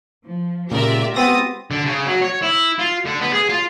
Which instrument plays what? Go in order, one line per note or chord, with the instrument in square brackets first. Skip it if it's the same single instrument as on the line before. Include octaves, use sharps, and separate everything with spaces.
[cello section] F3
[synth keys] A#2 C#3 [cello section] G#3 F4 G4 [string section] A#4 D5 E5
[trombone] B3 [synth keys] C4 B5 A#6 [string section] D#6 A6
[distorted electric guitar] D3
C#3
F#3
C#5
E4
F4
D3
B3
G#4
F4